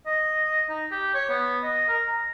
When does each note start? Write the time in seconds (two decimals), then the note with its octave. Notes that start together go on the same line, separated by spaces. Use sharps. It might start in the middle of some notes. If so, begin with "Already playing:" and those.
0.06 D#5
0.69 D#4
0.91 G4
1.14 C#5
1.30 B3
1.63 D#5
1.89 A#4
2.07 A#5